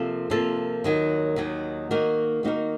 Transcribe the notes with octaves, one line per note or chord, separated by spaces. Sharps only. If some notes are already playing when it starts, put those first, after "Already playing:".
Already playing: C3 F3 A#3 F4 A4
C3 F3 A#3 F4 A4
D#2 D#3 F#3
D#2 D#3 F#3
D#3 A#3 D#4 F#4 A#4
D#3 A#3 D#4 F#4 A#4